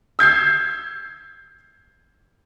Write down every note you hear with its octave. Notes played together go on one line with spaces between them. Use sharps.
E6 G6 G#6 C7